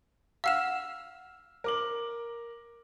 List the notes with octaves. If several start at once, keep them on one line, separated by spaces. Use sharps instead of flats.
F5 F#5 E6 F6 E7
A#4 D6 F#7